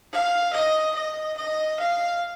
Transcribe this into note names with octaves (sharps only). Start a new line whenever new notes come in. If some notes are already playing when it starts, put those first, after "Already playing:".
F5
D#5
D#5
D#5
F5